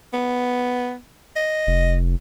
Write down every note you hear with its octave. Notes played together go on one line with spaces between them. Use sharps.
B3
D#5
F1